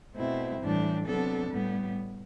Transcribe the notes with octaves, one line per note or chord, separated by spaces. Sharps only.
B2 A3 C4 E4
A2 E3 G3 D4
C3 F#3 B3 D4 A4
A2 G3 B3